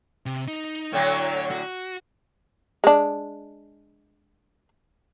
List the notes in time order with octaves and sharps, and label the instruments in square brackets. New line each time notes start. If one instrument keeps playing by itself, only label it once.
[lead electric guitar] C3
D#4
[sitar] A2 D3 F#3 [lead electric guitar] C#5
[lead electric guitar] F#4
[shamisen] G#3 D4